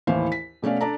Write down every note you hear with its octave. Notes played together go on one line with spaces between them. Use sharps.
A1 D#2 E3 E4 C5 F5
B6
B2 A3 C#4 D5 F5
D4 A4 D5 A5 A#5